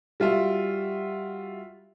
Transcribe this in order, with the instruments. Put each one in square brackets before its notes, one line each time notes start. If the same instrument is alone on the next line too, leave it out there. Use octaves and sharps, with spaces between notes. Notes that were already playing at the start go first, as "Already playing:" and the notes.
[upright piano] G3 F4 F#4 E5